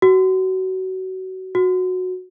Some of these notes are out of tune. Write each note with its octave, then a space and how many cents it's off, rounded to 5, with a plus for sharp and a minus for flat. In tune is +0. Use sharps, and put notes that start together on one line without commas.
F#4 +25
F#4 -10